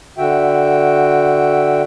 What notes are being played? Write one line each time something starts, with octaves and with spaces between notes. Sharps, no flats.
D3 F#4 E5 G5